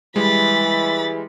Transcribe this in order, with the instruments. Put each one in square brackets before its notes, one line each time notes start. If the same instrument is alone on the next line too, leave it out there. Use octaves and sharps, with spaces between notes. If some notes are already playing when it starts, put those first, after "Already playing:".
[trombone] E3 [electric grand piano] G3 G#3 [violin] B5 A6